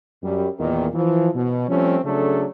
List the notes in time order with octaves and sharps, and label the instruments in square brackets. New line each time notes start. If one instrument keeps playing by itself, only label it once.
[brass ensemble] F#2 G3
E2 A#2 D#3
E3 F3
B2
F3 G3 A3 C4 C#4
C#3 F#3 A3 D4 G#4 A4